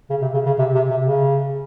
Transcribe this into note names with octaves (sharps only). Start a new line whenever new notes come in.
C#3
C3
C#3
C#3
C3
C3
C3
C#3